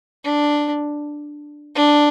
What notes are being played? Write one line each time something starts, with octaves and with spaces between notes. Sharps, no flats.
D4
D4